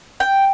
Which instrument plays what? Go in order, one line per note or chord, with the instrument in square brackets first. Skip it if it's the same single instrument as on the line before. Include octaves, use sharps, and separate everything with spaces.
[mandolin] G5